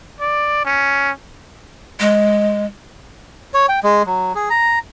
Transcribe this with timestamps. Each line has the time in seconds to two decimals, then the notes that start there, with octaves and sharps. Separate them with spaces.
0.20 D5
0.65 C#4
2.00 G#3
3.54 C#5
3.69 G5
3.83 G#3
4.06 F#3
4.35 G#4
4.50 A#5